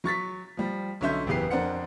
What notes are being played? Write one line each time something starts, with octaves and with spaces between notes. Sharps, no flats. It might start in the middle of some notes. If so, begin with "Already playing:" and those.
F#3 C#6 A6 B6
F3 G3
B1 D3 C#4 E5 C6 G6
F#1 E2 B3 G4 B4 C7
F2 D4 A#4 C5 F#5 C#7